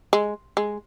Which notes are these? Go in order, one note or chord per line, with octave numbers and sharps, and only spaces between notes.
G#3
G#3